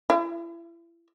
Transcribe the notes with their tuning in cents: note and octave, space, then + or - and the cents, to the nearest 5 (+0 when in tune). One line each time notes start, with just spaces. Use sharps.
E4 +35